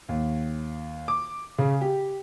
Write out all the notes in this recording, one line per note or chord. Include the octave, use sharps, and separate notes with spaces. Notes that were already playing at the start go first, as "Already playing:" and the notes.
D#2
D6
C#3
G4